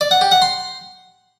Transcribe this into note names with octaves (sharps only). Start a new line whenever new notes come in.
D5
F#5
G4
F#5
C6